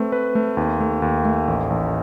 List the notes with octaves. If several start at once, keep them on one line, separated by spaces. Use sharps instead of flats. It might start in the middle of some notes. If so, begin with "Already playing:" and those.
Already playing: A3 C4 B4
B4
A3
D#2
A3
D#2
A3
A1
A1